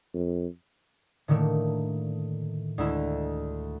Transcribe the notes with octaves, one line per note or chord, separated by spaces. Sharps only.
F2
A2 D3 D#3 A3 A#3
D2 G#3 E4